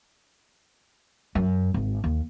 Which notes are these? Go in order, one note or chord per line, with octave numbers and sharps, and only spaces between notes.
F#2
G#1
D#2